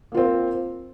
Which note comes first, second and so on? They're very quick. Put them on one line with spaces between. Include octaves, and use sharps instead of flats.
A#3 F4 C4